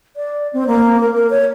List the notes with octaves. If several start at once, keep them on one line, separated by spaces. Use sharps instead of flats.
D5
C4
A#3
A#4
A#4
C#5